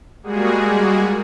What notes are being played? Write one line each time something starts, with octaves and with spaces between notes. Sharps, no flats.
G3 G#3 A#3 F#4 G#4